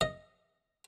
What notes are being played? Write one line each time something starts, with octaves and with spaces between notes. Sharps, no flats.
D#5